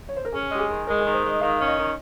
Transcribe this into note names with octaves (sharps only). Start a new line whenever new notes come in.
C#5
C5
A#4
C#4 G#4
G#3 G4
G#4
D#3
G#3 A#4
D#3 G#4
C5
G#3 D#5
D#3 F5
C#4
D#5
D#3